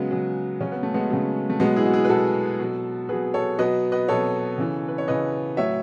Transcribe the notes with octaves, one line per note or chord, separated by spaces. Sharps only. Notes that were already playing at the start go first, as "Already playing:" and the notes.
Already playing: C#3 F#3 G#3 B3
C#3 F#3
C#3 F#3 C#4
B3
A3
G#3 B3
C#3 F#3
A3
B2 F#3 G#3 B3
E4 G#4
F#4
E4 G#4
B4
B2 F#3 F#4 A4
B2 F#3
B2 F#3 G#4 B4
A4 C#5
B2 F#3 B4 D#5
B4 D#5
B2 F#3 A4 C#5
C#3 E3
B4
C#5
C#3 E3 B4 D#5
A2 F#3 C#5 E5